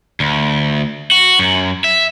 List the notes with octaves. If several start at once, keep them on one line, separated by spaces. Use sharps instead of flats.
D2
F#4
F#2
E5